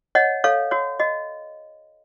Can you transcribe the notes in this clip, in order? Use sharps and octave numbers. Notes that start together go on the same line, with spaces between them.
C#5 D#5 F#5
A4 C#5 F5
F#4 C#5
F#4 D#5